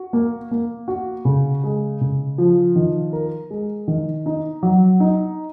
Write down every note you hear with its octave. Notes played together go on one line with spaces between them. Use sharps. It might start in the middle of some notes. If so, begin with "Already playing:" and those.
Already playing: F#4
A#3
A#3
F#4
C#3
G#3
C#3
F3
D#3
A#4
G#3
D#3
D#4
F#3
D#4